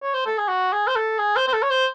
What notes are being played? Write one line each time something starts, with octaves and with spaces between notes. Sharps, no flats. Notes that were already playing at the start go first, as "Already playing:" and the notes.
C#5
C5
A4
G#4
F#4
G#4
C5
A4
G#4
C5
C5
A4
C#5
C5